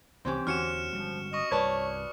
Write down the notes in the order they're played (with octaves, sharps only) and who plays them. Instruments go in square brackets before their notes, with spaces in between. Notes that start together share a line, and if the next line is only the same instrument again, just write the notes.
[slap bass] C2 D#3 [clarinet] E3 [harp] C4 C#4 G4
[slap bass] E2 D3 [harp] C#4 F#4 [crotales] F6 C#7 E7
[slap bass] G1 G3 G#3 [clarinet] F3
[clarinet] D#5 [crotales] C#6 D#6
[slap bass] C2 G2 [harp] B4 D5 A5 [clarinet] C#5